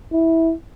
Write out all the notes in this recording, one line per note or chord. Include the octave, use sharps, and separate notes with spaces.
E4